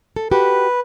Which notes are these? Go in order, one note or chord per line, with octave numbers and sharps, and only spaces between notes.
A4
F#4 G4 B4